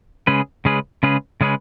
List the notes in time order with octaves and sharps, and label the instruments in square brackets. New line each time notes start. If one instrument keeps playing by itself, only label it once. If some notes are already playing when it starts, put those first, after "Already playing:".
[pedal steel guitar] C#3 G#3 C#4 G#4 B4
C#3 G#3 C#4 G#4 B4
C#3 G#3 C#4 G#4 B4
C#3 G#3 C#4 G#4 B4